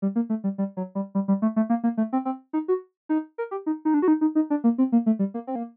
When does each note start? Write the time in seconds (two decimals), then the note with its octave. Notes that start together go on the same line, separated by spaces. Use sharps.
0.02 G3
0.16 A#3
0.30 A3
0.44 G3
0.58 G3
0.77 F#3
0.95 G3
1.15 G3
1.28 G3
1.42 A3
1.56 A3
1.70 A#3
1.83 A#3
1.97 A3
2.13 C4
2.25 C4
2.53 D#4
2.68 F#4
3.09 D#4
3.38 A#4
3.51 G4
3.66 D#4
3.85 D#4
3.94 D4
4.02 F#4
4.08 D#4
4.21 D#4
4.35 D#4
4.50 D4
4.64 A#3
4.78 C4
4.92 A#3
5.06 A3
5.19 G3
5.34 A#3
5.47 C4
5.55 A#3